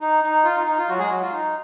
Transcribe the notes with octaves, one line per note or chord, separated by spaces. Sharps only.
D#4
D#4
F4
D#4
D#4
F4
F#3 F#4
G#3 G#4
F#3 F#4
F4
D#4